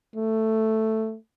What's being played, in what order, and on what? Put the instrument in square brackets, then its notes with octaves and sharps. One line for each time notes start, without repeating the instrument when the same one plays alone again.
[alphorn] A3